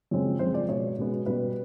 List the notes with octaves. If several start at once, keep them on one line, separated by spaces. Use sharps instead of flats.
F#2 C#3 F3 G#3 C4
F#2 C#3 F3 G#3 C4 C5
D5
B2 G#3 B3 C#5
B2 G#3 B3
B2 G3 B3 B4